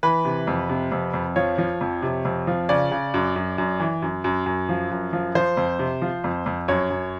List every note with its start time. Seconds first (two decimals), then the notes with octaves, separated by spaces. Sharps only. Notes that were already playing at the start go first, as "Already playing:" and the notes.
0.03 E3 B4
0.25 C3
0.47 F2
0.69 C3
0.92 F2
1.14 F2
1.36 F3 C#5
1.58 F3
1.81 F2
2.02 C3
2.25 F2
2.47 F3
2.69 C#3 D5
2.91 C#3
3.14 F#2
3.36 F#2
3.58 F#2
3.80 E3
4.02 F#2
4.24 F#2
4.46 F#2
4.69 F3
4.91 F#2
5.13 F3
5.35 F3 C5
5.57 F2
5.79 C3
6.02 F3
6.24 F2
6.46 F2
6.68 F#2 C#5
6.90 F#2